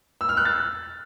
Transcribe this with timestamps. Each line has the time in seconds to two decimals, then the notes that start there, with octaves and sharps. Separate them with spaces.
0.21 E6
0.29 F6
0.37 F#6
0.45 A6